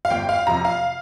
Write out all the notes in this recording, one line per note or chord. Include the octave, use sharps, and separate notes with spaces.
F5
G1 G5
F5
F2 C3 A#5
F5